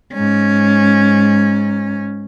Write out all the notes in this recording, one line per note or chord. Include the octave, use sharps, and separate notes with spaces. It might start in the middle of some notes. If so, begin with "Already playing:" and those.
G#2 C#4